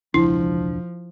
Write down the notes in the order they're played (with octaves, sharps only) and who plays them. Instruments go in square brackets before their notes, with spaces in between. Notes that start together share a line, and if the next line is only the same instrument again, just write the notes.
[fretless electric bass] E1 C#2 D4 [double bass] F3 [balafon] E4